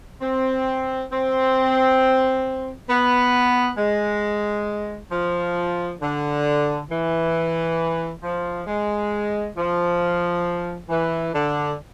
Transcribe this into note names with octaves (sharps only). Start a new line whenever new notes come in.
C4
C4
B3
G#3
F3
D3
E3
F3
G#3
F3
E3
D3